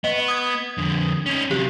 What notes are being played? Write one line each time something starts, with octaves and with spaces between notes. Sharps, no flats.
B3 D#5
D#6 G#6
F2 D3
C#4 D#4
C3 F#3 G4